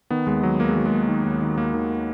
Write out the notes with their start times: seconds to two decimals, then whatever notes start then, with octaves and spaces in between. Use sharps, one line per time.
0.10 D#3 B3
0.26 D#2 G#3
0.43 D#3 F#3
0.60 D#2 A#3
0.68 G#3
0.76 D#3 F#3
0.86 G#3
0.92 D#2
1.08 D#3
1.25 D#2
1.41 D#3
1.58 D#2 A#3
1.74 D#3